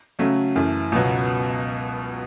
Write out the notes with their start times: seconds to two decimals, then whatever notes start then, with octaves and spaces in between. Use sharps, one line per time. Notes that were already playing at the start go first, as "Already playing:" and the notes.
0.19 C#3 F#3 A3 C#4
0.56 F#2 E3 A3
0.92 C#2 B2 F#3 B3